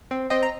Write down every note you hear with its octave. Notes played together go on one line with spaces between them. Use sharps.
C4
C4 D#5 G5
A#5